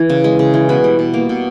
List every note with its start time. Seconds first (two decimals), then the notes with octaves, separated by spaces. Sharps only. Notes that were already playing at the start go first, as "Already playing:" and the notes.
Already playing: E3
0.09 C#3
0.24 G#3
0.39 C#3
0.54 E3
0.69 B2 B4
0.84 G3
0.99 B2
1.14 A#3
1.29 B2